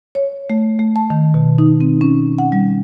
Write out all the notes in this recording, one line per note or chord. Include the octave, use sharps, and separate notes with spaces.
C#5
A3
A3
A5
D#3
B2
D#4
C4
C#4
F#5
G3